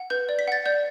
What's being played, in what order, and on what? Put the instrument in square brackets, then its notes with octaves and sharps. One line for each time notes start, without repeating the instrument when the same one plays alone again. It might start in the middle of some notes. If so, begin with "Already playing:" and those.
Already playing: [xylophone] F#5
B4 G6
D5
B6
F#5 A6
D5 G6